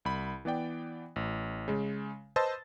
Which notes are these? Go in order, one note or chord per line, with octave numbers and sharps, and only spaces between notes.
C2 B5
E3 B3 D5 G5
A1
C#3 G#3
B4 C5 D#5 A5 E6 A6